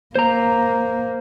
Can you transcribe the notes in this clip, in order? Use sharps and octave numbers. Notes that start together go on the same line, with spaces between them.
A#3 C5 A#5